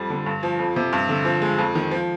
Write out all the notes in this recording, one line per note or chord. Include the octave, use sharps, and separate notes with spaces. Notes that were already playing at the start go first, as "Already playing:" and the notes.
Already playing: F2 G3
D3
G2
F3
F2
C3
G2
D3
F3
G#3
F2
D#3
F3